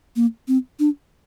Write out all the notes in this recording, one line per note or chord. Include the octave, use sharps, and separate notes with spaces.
A#3
C4
D4